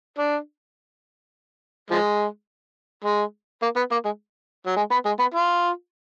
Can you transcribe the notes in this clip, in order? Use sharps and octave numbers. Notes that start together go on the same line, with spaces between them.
D4
F3 G#3
G#3
A#3
B3
A#3
G#3
F#3
G#3
B3
G#3
B3
F4